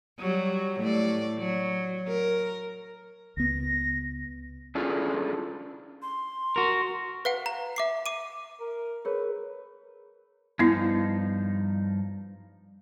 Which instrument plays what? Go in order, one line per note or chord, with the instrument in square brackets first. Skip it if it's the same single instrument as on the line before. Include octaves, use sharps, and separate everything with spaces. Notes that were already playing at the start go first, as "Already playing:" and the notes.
[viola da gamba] F#3 G3
A2 D5
F#3
A#4
[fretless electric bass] C#2 B3 [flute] A#6
[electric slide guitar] C#4 D4 E4 F4 G#4 A4
[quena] C6
[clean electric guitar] F#4 A#4
[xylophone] B4 F5 F#5
A#5
E5 D6 C7
D6 D#7
[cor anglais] A#4
[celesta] G#4 A#4 C#5 [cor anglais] B4
[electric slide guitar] G2 F3 D#4 [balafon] B3 E4